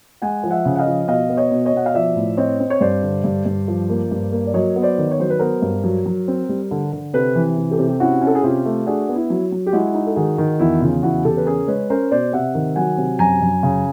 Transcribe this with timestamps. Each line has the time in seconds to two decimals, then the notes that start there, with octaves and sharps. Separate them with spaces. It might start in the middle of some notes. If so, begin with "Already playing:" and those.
0.22 G#3 F#5 G#5
0.43 F3
0.50 E5 F#5
0.65 C#3
0.75 F#5
0.79 D#5 F5
0.86 F3
1.08 B2 D#5 F5
1.29 B3
1.37 C#5 D#5
1.51 B2
1.66 C#5 D#5
1.73 B2 F#5
1.86 F5
1.94 F3 D5 E5
2.16 A2
2.37 C4 C#5 D#5
2.60 C4
2.70 C#5
2.81 G2 C5 D5
3.03 D3
3.24 G2
3.45 G2
3.68 F3
3.89 A#3
4.11 G2
4.32 A#3
4.47 D5
4.54 F#3 C#5 D#5
4.76 B3
4.82 C5 D5
4.98 D#3
5.11 C#5
5.20 F#3 C5
5.30 B4
5.39 B3 A#4 C5
5.62 G2
5.84 F#3
6.06 F#3
6.28 C4
6.49 G3
6.71 D3
6.93 D3
7.14 C3 A4 B4
7.35 E3
7.57 C3
7.71 G4 A4
7.79 C3
7.88 G4
8.00 C#4 E4 F#4
8.21 C#4
8.27 A4
8.35 G#4
8.43 C3 F4 G4
8.65 A3
8.86 D4 F#4 G#4
9.09 B3
9.16 E4
9.30 F#3
9.52 F#3
9.66 G4
9.73 G#3 E4 F#4
9.94 D#4
10.07 A4
10.16 D#3 F#4 G#4
10.38 D#3
10.59 E2 E4 F#4
10.81 C#3 F4
11.03 E2 E4 F#4
11.25 C#3 G4 A4
11.37 B4
11.46 C#4 G#4 A#4
11.67 G#3 B4 C#5
11.90 C#4 A#4 C5
12.11 B2 C5 D5
12.32 C3 E5 F#5
12.54 D#3
12.76 F#3 F#5 G#5
12.97 C3
13.19 F#2 G#5 A#5
13.42 F#2
13.63 C#3